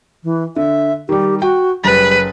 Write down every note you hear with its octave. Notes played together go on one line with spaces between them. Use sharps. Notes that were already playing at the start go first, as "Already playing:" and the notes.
E3
D3 E5
D#3 G3 G4
F#4 G5
F#1 G3 B4 A6